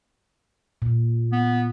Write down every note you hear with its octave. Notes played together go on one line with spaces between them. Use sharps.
A#2
B3